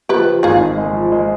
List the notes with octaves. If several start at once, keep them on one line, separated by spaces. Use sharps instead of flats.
F3 G4 B4
F3
G#1 F4 G#4
G#3
G#3
F3
G#3